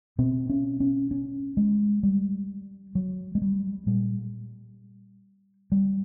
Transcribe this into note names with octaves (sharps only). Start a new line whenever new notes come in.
B2 C4
C#4
C#4
C#4
G#3
G3
F#3
G#3
G3
A#2 G3
G3